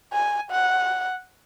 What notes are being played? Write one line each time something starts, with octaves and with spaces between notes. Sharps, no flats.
G#5
F#5